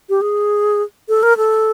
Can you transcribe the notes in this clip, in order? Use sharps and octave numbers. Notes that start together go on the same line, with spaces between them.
G4
G#4
A4
A#4
A4